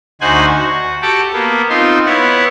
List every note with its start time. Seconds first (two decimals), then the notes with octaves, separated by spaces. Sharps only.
0.21 D2 D#4 F#4 C5 G#5 F#6
0.59 F#4
1.02 F#4 G4 A4 G5 A5
1.33 A#3 B3
1.69 C4 D#4 F4 C6
2.06 B3 E4 C#5 F#5